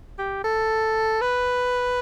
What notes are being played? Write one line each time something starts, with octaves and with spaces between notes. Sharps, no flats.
G4
A4
B4